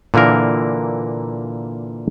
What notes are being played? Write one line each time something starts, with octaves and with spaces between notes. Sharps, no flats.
A#2 D3 E3 A#3 A#4